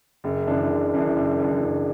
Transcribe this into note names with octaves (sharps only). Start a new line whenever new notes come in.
F#1
F#2 E3 D4
F#1
F#2 E3 D4
F#1
F#2 E3 D4
F#1